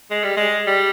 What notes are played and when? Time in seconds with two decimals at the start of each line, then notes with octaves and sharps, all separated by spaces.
0.10 G#3
0.24 G3
0.37 G#3
0.67 G3